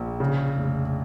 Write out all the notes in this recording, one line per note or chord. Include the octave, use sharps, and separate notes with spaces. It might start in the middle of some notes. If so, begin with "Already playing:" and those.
Already playing: A#1
C#3
F1